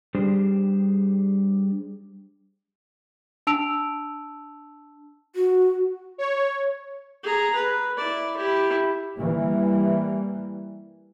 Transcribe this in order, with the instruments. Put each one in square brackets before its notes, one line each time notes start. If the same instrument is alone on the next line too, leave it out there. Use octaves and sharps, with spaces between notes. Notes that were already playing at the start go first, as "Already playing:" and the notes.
[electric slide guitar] G3 D4 G4 G#4 C5
[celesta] D4 A5 E6 D7 F7
[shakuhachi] F#4
[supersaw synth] C#5
[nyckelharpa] G#4 A#5
B4
E4 D5
E4 G4
[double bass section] E3 G3 A#3